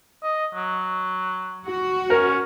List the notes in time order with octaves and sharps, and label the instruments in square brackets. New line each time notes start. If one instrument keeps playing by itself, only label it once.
[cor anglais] D#5
F#3
[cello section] F#4
[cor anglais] C#4 [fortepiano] A#4